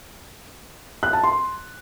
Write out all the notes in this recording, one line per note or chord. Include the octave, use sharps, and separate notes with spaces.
F#6
A5
C6